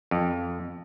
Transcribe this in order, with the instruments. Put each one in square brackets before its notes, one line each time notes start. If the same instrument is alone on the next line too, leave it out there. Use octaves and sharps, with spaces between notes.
[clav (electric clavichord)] F2